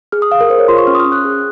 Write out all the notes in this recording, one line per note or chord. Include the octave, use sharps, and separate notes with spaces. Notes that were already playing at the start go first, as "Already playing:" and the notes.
G#4 F6
D#6
G#4 F5
A#4
G#4 C5
C#5
F4 C6
C#6
C#4 F6
D#6
F6
C#4
F#6
G#4